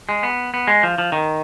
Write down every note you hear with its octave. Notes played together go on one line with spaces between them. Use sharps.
G#3
B3
B3
G#3
F3
F3
D#3